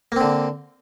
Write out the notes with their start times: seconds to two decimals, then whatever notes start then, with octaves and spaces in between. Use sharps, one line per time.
0.12 A#3
0.16 C4
0.21 D3